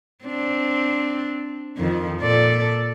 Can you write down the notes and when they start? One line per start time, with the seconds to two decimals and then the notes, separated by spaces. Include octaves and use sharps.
0.25 C4 D4
1.77 F2 D#3 F3
2.20 A#2 A4 D5